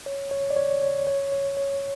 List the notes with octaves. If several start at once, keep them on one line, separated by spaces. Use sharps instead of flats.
C#5
C#5
D5
C#5
C#5
C#5
C#5
C#5